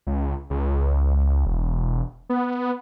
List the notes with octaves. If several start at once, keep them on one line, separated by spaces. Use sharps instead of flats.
C#2
C#2
E1
B3